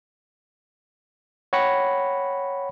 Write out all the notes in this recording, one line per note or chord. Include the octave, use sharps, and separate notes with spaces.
C#5 F#5 G5 B5 A#6 C#7